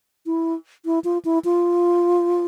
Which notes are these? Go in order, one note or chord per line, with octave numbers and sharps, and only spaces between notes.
E4
E4
F4
E4
F4